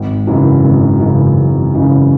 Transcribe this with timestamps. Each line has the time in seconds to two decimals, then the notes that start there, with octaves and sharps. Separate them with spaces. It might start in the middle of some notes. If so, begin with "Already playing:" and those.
Already playing: G#1
0.27 F#2 C#3 E3
0.64 G#1
1.00 F#2 C#3 E3
1.38 G#1
1.74 F#2 C#3 E3